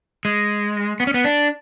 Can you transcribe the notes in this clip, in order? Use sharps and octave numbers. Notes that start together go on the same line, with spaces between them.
G#3
B3
C#4
B3
D4